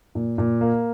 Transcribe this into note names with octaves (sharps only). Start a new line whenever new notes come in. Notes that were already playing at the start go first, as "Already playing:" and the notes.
A#2
A#2
A#3